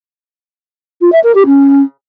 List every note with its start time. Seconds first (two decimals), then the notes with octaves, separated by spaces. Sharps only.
1.01 F4
1.12 E5
1.24 A#4
1.35 G4
1.46 C#4